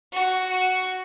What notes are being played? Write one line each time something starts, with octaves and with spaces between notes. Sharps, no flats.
F#4
F#4